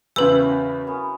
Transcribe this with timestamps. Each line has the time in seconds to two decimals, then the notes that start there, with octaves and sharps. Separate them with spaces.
0.16 E2 C#3 E4 B4 C5 G5 E6
0.32 F#3 A#3 C#6
0.87 B3 C#4 A#4